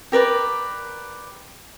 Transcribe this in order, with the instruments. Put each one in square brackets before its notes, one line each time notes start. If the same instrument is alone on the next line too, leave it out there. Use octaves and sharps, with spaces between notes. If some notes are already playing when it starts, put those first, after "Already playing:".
[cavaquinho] G4 A#4 B4 D5